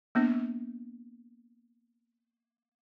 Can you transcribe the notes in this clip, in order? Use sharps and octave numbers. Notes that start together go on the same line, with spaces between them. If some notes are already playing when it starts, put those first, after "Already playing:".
A#3 B3 D4